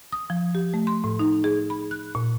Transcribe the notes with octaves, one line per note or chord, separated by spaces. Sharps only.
D#6
F3
G4
A3
C6
A2
D#4
G#4
B5
F#6
A#2